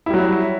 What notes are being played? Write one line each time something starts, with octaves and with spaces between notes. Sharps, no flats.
F#3 G3 E4